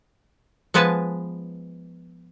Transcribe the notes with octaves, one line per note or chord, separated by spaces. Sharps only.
F3 G#3 B3 B4 G#5 A5